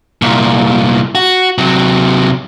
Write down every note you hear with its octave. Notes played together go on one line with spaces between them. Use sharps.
C2 A#2
F#4
C3 F#3